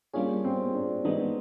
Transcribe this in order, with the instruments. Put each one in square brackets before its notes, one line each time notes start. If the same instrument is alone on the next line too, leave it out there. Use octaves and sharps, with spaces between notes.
[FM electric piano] G3 A#3 D4 F4 G#4 [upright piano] C#4
[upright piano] C4
D4
[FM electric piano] E3 G#3 B3 D4 [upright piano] D#4